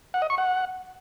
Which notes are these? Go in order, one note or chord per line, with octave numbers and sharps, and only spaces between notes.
F#5
D#5
C#6
F#5